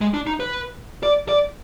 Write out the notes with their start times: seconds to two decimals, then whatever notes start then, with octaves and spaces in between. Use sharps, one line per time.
0.01 G#3
0.14 D4
0.27 D#4
0.40 B4
1.03 D5
1.29 D5